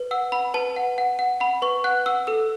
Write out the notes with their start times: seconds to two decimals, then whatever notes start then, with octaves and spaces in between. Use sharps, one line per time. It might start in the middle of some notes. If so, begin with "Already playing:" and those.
Already playing: B4
0.11 F#5 E6
0.32 F#5 B5
0.54 B4 A5
0.76 F#5
0.98 F#5
1.19 F#5
1.40 F#5 B5
1.62 B4 C#6
1.84 F#5 F#6
2.06 F#5 E6
2.27 A4 E6